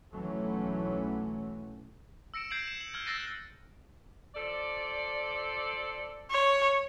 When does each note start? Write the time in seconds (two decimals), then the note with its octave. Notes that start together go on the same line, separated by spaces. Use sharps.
0.13 B1 E3 F#3 A3 C#4
2.34 E6 A#6 C#7 D7 E7
2.50 G6 G#6 C7 D7 E7 F#7
2.68 E7
2.80 F#7
2.94 F6 G#6
3.06 E6 F#6 A6 A#6 C7 D#7
4.34 F3 A4 D5
6.31 C#5